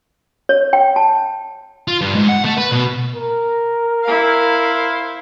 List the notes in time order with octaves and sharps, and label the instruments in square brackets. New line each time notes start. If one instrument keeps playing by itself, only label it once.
[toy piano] C#5
G5
A5
[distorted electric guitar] F4
G2
G#2
F#5
A3
B4
B2
[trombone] A#4
[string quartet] E4 C5 F5